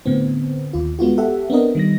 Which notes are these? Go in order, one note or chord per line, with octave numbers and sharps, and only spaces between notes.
A2 D3 B3 C4
D#2 F4
G#3 B3 F4 F#4
G4 A4 E5 F#5
B3 C4 D4 A#4 D#5
D#3 G3 A#6